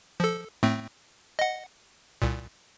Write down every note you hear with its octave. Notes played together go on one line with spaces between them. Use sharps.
F3 A4
A2 A3 C4
D#5 F#5
C2 A#2